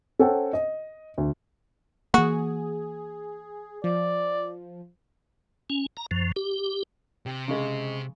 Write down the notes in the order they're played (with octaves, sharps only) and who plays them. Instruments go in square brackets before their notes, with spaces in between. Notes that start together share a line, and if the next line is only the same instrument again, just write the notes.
[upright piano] C#4 A4 C5 F#5 G5
D#5
D2
[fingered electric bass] E3 A#3 [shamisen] F#4 [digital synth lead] G#4
[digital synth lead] F3 [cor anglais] D5
[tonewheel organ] C#4
A#5
F#2 F3
G4
[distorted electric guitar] C3 [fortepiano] G4
[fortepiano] C#3 G#3